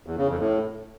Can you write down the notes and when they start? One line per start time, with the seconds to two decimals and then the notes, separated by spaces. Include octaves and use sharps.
0.06 E2
0.17 C#3
0.28 F2
0.39 A2